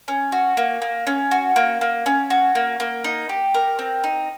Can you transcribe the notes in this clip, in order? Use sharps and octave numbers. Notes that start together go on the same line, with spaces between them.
C#4
F#4
A#3
A#3
C#4
F#4
A#3
A#3
C#4
F#4
A#3
A#3
D#4
G4
A#4
C4
D#4